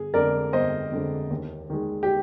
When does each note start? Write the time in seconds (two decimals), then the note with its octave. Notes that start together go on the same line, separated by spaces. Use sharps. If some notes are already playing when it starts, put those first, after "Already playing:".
Already playing: G1 G#4
0.14 F2 D3 G#3 A#4 D5
0.53 G1 C5 D#5
0.91 F2 D3 G#3
1.31 D#2
1.70 D#3 G#3
2.03 G4